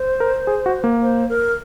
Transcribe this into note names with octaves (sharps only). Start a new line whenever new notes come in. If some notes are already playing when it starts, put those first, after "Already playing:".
Already playing: C5
A#4
G#4
F#4
A#3
C5
A#4